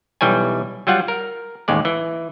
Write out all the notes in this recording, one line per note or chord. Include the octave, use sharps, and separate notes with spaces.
B1 E3 G3 C#5 G#5
F#3 G3 F4 F#5
A#4
A1 D#2 G#3 D5
E3